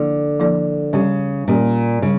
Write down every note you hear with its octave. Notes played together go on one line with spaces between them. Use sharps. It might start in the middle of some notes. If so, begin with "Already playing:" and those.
Already playing: D3 F3 A#3 E4 A4 D5
F3 A#3 E4 A4 D5
C#3 G3 C#4 G4
A#2 G3 C#4 G4
C#3 G3